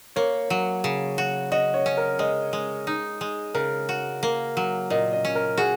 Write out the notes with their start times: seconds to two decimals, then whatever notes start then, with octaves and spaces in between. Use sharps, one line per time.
0.16 A#3 C#5
0.50 F#3
0.84 C#3
1.18 F#4
1.52 F#4 D#5
1.74 C#5
1.86 C#4
1.97 A#4
2.19 G#3 D#5
2.53 G#3
2.87 D#4
3.21 G#3
3.54 C#3 A#4
3.89 F#4
4.23 A#3
4.57 F#3
4.90 A#2 D#5
5.13 D#5
5.25 C#4
5.35 A#4
5.57 F#4 G#4